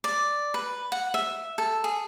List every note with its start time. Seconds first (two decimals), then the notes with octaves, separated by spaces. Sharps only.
0.04 D5
0.54 B4
0.92 F#5
1.14 E5
1.58 A4
1.84 G#4